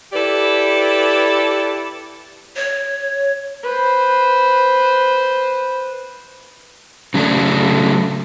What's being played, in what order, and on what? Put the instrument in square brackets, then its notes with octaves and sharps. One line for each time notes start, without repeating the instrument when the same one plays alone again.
[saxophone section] E4 G4 A4 B4 D5
[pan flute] C#5
[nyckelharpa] B4 C5
[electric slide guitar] C#3 F#3 A3 D4